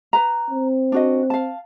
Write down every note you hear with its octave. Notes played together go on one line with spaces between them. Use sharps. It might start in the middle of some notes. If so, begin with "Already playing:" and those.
B4 A#5
C4
D4 F#4 D#5
F5 A5